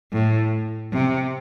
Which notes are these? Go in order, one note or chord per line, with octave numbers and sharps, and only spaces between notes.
A2
C3